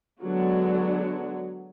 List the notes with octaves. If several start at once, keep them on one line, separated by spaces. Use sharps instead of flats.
D3 F#3 G#3 B3 D4 F#4